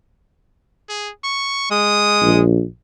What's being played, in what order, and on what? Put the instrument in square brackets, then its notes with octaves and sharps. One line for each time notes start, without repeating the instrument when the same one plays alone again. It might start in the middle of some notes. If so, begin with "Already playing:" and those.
[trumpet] G#4
C#6
[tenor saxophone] G#3 [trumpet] D#6
[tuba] A#1